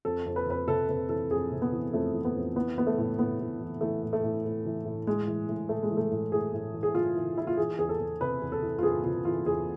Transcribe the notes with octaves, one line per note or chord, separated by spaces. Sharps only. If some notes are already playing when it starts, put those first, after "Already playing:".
F2 A4
F2
B4
F2 B4
C3 A4
C3 B4
E3 A4
F2 G#4
C3
B3
E3
F2 A3
E3
B3
F2
E3 B3
E3 B3
A3
A2
A2 B3
A2
E3
E3 A3
A2
A3
A2
A2
E3
A2
A2 G#3
E3
A2
A2 A3
G#3
E3
A3
A2
A2 G#4
A2
E3
G#4
E3 F4
E3
E3 E4
F4
E3 G#4
E2 G#4
A4
E2
C3 B4
E2
A4
E3
F4
E2 G#4
C3 F4
E3 F4
E2 G#4